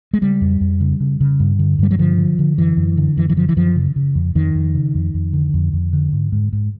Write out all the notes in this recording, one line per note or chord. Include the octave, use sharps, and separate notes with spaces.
G#3
C#3 G3
F2
F2
C#3
C#3
C#3
G2
D3
G2 G3
F#3
D3 F3
D3
D3
F#2 E3
F#2
D3
F#2 E3
E3
D3 F3
E3
F#2 F3
C#3
C#3
F2
F2 D#3
F2
C#3
F2
F2
D3
F2
F2
D3
G#2
G#2
G#2